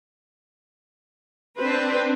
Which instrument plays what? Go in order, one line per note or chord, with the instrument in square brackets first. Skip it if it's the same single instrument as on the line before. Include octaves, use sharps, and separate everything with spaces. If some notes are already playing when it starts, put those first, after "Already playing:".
[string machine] C4 D4 [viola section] B4 C5